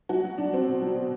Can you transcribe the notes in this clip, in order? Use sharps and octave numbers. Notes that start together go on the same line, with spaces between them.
F#3 F#4
F#3
F#3 D4
F#3 C4
B2
F#3
B2